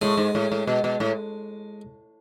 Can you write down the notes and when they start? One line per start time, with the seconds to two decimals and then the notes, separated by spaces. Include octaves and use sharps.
0.02 A2 G#3
0.17 G#2
0.35 A2
0.52 A2
0.67 B2
0.84 B2
1.00 A2